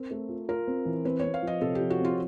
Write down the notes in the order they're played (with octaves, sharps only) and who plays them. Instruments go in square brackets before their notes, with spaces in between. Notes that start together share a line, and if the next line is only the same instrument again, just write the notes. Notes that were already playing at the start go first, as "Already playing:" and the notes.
Already playing: [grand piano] C4 [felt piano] A#4
[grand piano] A3
F4
[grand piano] F4 [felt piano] A#4
[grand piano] C4
E3
[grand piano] C4 [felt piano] B4
[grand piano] C4 [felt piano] C#5
[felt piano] F5
[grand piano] F3
[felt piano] D#5
[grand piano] C3 [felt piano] A4
[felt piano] G4
[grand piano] F3
[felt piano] F#4
[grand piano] C4 [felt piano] F4